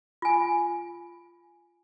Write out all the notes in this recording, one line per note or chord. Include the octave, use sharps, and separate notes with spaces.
F4 G#5